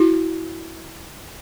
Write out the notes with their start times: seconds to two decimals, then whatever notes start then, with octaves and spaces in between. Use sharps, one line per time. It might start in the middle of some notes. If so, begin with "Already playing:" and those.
Already playing: E4 F#4